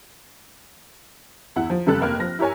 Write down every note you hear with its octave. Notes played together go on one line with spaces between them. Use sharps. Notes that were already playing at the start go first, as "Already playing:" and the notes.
E2 E4 F#5
F3
F1 C#3 G3 A4 F#6
F1 A#3 F6
F3 A#6
E4 G4 A#4 C#5 G#5